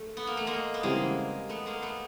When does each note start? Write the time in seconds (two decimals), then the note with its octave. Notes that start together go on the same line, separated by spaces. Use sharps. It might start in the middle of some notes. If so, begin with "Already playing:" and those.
Already playing: A3
0.17 B3
0.27 A#3
0.37 A3
0.47 G#3 A#3
0.74 B3
0.83 C#3 E3 G3 G#3 A#3 C4
1.49 A3 B3
1.66 G#3 A#3
1.82 A3 B3